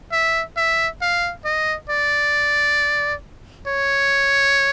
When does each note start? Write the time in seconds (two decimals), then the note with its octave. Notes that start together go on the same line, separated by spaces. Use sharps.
0.12 E5
0.57 E5
1.02 F5
1.45 D#5
1.89 D5
3.67 C#5